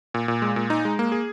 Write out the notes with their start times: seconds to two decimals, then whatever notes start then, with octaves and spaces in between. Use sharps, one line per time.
0.14 A#2
0.28 A#2
0.42 G#3
0.56 A#2
0.70 D#4
0.85 G#3
0.99 A#3
1.12 G#4